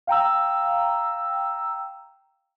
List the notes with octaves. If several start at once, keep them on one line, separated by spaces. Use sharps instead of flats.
F5 G5 A#5 E6